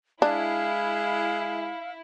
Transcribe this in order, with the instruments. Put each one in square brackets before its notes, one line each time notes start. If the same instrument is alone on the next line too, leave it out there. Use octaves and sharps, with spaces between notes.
[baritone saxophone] G#3 [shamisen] D4 [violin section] E4 [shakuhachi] F5